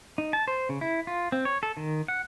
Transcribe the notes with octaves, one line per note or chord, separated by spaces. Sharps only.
D#4
A5
C5
C#3
E4
F4
C4
C#5
A4
D#3
F#5